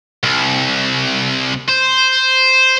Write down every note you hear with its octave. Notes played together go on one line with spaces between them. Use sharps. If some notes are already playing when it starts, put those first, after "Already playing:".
C2
C5